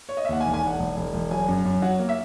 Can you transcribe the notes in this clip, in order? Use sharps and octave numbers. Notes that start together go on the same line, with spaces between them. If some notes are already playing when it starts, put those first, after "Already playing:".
C#5
D#5
E5
D#2 F#5
G#5
E1
G#5
E1 F#5
E1
E1
E1
F#3 G#5
F#2
F#2
F#3 F#5
A#3
E5